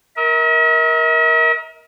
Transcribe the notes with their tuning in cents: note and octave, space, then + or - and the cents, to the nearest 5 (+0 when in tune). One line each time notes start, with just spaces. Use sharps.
A#4 +15 E5 -45